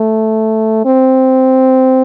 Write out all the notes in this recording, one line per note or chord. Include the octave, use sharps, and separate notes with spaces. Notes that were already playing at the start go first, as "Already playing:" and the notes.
Already playing: A3
C4